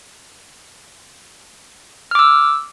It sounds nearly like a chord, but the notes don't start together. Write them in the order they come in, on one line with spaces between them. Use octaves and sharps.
F6 D6 E6